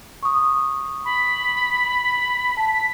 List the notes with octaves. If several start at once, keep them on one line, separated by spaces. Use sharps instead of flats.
C#6 D#6
B5
A5 B6